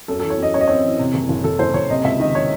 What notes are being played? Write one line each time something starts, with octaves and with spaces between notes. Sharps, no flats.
F#2 A4
E3 A4
C#5
F#2 D#5
F#2 C#5
D#5
C4 C#5
E3
C3
F#1
F#1
F#1 A4
F#1 C5
F#1 C#5
C3 D#5
C#2 E5
D#3 D#5
C#5